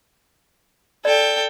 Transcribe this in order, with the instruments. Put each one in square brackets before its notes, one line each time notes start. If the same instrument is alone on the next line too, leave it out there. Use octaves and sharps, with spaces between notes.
[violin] A4 G5 [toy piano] D5